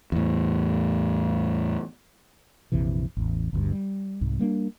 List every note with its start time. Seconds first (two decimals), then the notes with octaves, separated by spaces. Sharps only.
0.12 E2 A2
2.72 A#1 F2 C3 E3
3.17 A1 E2
3.53 G1 D2 G2
3.72 G3
4.21 C2 G#2
4.39 G3 A#3 B3 D4